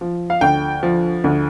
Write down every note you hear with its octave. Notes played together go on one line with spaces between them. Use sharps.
F3
F5
D2 G5
F3
D2